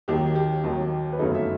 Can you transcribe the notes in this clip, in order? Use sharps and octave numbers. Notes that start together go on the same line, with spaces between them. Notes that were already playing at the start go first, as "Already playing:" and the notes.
D#2 D#3 F#3 G4
G4
D#2 D#3 F#3
B4
G1 F#2 F#3 A3 D#4 A4
E5